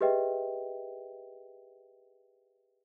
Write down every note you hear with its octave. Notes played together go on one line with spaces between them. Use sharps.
G4 G#4 B4 D#5 E5 G5